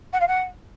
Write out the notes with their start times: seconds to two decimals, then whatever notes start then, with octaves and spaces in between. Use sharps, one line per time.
0.13 F#5
0.20 F5
0.28 F#5